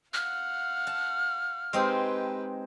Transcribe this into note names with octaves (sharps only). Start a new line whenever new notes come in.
F5 F#5 F6
A5
G#3 C4 D#4 G4 B4